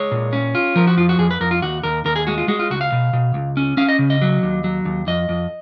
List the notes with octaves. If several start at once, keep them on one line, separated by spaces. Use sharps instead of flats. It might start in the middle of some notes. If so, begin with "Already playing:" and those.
Already playing: G#3 C#5
A#2
C#4
F4
F3 A#4
F#4
F2 F4
F#4
F2 G#4
B4
F2 A#4
F4
D#2 F#4
D#2 A#4
D#2 A#4
G#4
G#3 F#4
F4
G#3 F#4
F4
C#2 F#4
F5
B2
B2
C#2
C#4
C#4 F5
D#5
C#3
D#5
F#3
D#2
F#3
D#2
F2 D#5
F2